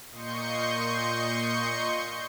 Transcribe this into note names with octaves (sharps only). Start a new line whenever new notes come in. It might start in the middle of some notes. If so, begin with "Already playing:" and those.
A#2 D#5 C6 C#6 G6 C#7